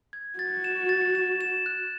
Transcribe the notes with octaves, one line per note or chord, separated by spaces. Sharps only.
G#6
F#4 A6
E7
A6
E7
E7
F#6